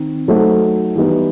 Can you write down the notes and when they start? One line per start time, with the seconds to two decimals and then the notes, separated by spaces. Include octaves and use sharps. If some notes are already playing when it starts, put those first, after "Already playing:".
Already playing: D#3 C4
0.28 F#3 A3 D#4 A4 C5
0.96 E3 G3 B3 D#4